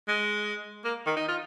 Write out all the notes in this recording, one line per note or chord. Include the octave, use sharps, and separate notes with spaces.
G#3
A#3
D#3
D#4
F4